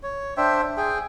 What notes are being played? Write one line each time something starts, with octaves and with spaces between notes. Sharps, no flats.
C#5
D4 C5 E5 G5
G#4 G5